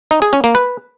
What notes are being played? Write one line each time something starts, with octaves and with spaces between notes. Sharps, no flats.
D#4
G#4
C#4
A#3
B4